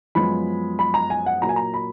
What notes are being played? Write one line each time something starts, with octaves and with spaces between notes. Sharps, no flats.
F#2 F3 G#3 B3 B5
B5
A#5
G#5
F#5
A#2 F#3 A#3 A#5
G#5
A#5
B5